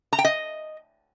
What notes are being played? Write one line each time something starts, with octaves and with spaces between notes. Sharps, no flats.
A#5
G5
D#5